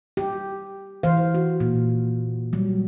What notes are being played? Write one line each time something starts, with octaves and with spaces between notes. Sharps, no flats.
G4
E3 C5 F5
F#4
A#2
F#3 G3